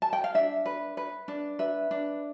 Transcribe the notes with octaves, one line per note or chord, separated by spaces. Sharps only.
A5
G5
F5
D4 E5
B4
B4
D4
B4 E5
D4